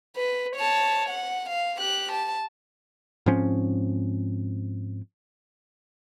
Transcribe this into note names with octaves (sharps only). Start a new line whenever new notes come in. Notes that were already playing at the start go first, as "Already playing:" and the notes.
B4
C#5 A5
F#5
F5
G4 F#6
A5
G#2 F3 C4 C#4